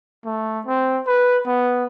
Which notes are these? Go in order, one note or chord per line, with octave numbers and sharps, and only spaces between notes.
A3
C4
B4
B3